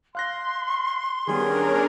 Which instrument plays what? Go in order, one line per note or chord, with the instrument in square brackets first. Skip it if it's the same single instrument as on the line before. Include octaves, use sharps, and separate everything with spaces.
[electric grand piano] F5 F#6 A#6 [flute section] C6
[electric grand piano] D#3 G3 B3 [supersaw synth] C#4 D4 A#4 [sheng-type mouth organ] G#4